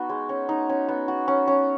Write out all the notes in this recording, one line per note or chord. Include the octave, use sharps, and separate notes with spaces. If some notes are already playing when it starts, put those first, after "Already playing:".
Already playing: B3 D#4 F#4
G#3
C#4
D#4
C#4
B3
F#4
C#4
C#4